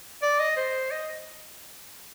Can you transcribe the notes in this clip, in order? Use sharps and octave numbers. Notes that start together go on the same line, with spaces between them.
D5
D#5
C5
D#5